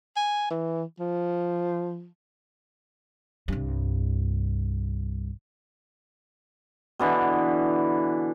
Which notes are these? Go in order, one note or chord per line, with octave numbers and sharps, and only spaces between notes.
G#5
E3
F3
C2 G2
B2 D3 E3